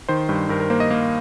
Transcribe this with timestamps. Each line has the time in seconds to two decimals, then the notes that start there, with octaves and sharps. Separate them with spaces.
0.09 D#3 C5
0.29 G2
0.49 G2 A#4
0.60 A#4
0.70 A#3 C5
0.80 D#5
0.90 A#3 F5